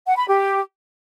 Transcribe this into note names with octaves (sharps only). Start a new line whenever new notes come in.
F#5
B5
G4